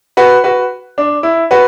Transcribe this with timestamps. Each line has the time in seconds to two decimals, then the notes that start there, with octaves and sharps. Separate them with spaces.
0.17 F#4 B4
0.44 F#4 B4
0.98 D4
1.23 E4
1.51 F#4 B4